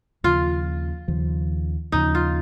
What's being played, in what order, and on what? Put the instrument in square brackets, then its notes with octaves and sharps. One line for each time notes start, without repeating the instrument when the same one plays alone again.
[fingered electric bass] D#2 C#3 F3 [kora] F4
[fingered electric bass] D#2 C#3 F3
[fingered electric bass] D#2 C#3 F3 [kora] D#4
[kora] F4